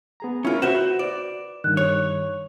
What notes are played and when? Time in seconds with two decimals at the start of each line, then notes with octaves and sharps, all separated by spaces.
0.20 B3 G#4 A#5
0.45 C#4 E4 F4 A#4
0.62 F#4 B4 C5 E5 E7
0.99 D5
1.64 G2 D#3 F#6
1.77 C#5 F7